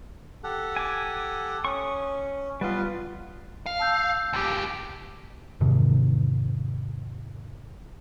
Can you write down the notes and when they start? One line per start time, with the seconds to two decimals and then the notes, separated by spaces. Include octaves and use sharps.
0.44 G4 A4 F#5
0.76 G#5 D6
1.65 C#4 C#6 D#6
2.61 G3 B3 F4 B4
3.66 F5
3.80 A5 E6 G6
4.33 C#2 G4
5.60 E2 G#2 C3 D#3